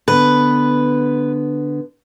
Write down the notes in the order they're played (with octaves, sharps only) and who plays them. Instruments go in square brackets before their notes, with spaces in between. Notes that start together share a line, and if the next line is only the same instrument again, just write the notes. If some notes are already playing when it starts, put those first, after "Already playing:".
[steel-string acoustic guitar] D3 B3 [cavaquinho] B4